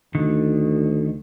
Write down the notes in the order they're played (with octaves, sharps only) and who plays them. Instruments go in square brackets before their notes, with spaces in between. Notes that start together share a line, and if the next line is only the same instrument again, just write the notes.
[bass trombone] D2 [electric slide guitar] D3 D#3